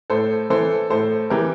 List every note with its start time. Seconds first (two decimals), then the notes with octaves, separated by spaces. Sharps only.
0.10 A2 A4 C5
0.50 E3 A4 C5
0.90 A2 A4 C5
1.30 E3 G4 A#4